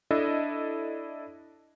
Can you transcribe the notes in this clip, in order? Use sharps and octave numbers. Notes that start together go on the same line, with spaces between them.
D4 E4 A4 D#5